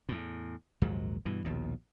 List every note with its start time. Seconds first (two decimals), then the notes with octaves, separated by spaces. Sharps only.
0.09 E2 A2
0.82 A#1 D#2 G#2 F#3
1.25 G2 B2 E3
1.45 A#1 D#2 B2